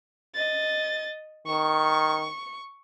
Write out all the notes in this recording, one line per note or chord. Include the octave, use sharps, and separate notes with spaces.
D#5 A6
D#3 C#6